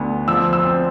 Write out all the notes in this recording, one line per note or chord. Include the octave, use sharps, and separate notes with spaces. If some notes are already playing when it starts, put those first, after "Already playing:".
Already playing: D2 D3 B3
F3 E6
E6
C4